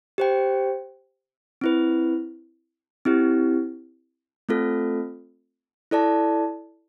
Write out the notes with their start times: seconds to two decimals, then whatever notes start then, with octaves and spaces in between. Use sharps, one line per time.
0.18 G4 C5 G5
1.61 C4 E4 B4
3.05 C4 E4 G4
4.49 A3 C4 F4 A4
5.91 E4 A4 D5 A5